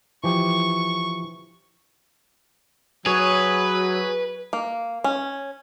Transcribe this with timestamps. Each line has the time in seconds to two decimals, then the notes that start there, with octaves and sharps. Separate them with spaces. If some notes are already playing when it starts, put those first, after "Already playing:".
0.24 E3 F3 G4 C#6
3.06 F#3 G#4 B4 C#5
4.53 A#3
5.04 C#4